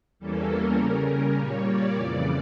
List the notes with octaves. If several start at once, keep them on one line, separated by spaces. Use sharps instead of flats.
E2 E3 G3 A#3 C#4 A4
A#4
C#3 G3 C#4
A#4
A#2 G3 A#3 C#5
D5
F2 C#3 E3 D5